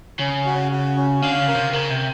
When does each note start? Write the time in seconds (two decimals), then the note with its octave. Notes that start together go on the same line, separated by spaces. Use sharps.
0.20 C#3 C#4
0.46 F#4
0.72 F#4
0.96 C#4
1.22 D3 F5
1.40 C#3
1.48 A#4
1.56 C3
1.73 C#3 A#4
1.90 C3